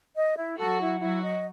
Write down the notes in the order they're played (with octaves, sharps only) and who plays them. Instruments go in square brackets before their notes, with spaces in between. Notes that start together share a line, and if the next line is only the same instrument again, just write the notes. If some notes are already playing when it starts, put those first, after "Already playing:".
[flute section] D#5
E4
[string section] F#3 F#4 [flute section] A4
[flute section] E4
[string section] F#3 F#4 [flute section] E4
[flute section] D#5